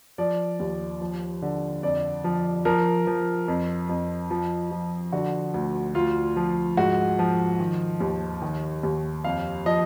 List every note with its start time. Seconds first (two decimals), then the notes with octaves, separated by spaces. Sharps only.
0.18 F3 D5
0.60 D#2
1.01 F3
1.42 D3
1.83 F2 D5
2.24 F3
2.65 F3 A#4
3.07 F3
3.48 F2
3.89 F2
4.30 F3
4.71 F3
5.12 D3 F#4
5.54 D2
5.95 D2 F4
6.36 F3
6.77 G#2 F#4
7.19 F3
7.60 D#3
8.00 D#2
8.42 D#3
8.83 D#2
9.24 F2 F5
9.66 F3 D#5